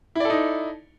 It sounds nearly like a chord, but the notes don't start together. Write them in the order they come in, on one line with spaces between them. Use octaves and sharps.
E4 D5 A4 D#4